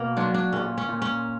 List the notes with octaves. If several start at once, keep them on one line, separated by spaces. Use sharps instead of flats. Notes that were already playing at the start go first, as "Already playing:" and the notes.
Already playing: B2 A#3
F#3 D4
D4
A#2 C#4
C#4
A#2
C#4